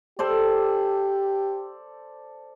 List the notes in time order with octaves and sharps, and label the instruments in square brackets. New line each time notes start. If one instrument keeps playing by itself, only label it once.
[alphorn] G4 [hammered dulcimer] A4 C5 D5